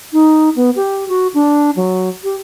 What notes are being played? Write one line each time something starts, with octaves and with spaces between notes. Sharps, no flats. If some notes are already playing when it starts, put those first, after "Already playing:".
D#4
B3
G4
F#4
D4
F#3
G4